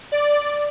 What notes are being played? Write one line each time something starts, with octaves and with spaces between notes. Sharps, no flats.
D5